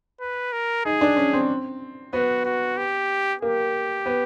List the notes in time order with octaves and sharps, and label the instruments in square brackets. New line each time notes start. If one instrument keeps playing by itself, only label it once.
[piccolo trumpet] B4
A#4
[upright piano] D#4 [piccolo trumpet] G#4
[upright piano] D4
C#4
C4
[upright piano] B3 [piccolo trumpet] F#4
[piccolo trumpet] F#4
G4
[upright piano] A#3 [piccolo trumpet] G4
[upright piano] B3